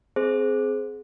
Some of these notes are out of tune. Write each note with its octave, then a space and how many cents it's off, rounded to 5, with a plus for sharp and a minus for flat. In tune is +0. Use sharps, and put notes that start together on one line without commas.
C4 -15 G#4 +25 C5 +0